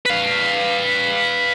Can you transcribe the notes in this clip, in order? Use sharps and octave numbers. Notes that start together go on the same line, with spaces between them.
B4 F5